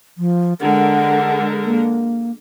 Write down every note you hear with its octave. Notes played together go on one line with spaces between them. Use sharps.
F3
D3 G#3 A#4 F#5
A#3